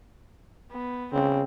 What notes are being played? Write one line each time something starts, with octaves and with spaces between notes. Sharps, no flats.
B3
C#3 C4